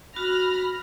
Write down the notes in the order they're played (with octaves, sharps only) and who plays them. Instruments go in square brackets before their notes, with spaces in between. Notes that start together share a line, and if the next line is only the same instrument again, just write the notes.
[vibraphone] F#4 [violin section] B5 F6 A#6